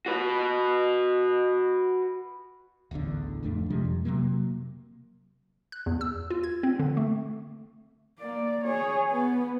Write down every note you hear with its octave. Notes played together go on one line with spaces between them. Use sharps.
F#4 B4
D1 A1 E2 D3
D1 F2 A3 D4
C3 F3 G3 G#3
F2
C3 F#3 A#3
F#6
E2
E6
F4
G#6
C4
D3
A3
A#3 D5
G#4 C#5
B3